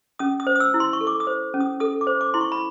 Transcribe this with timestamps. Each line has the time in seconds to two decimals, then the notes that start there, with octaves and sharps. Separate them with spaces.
0.19 C#4 D#6
0.40 D#6
0.47 C5
0.56 D#6
0.60 E6
0.74 E4
0.80 C6
0.93 C#6
1.01 A4
1.07 D6
1.20 D#6
1.27 C5
1.54 C#4
1.60 D#6
1.80 A4 D#6
2.01 D6
2.07 C5
2.21 D6
2.34 E4 C6
2.41 C#6
2.52 B5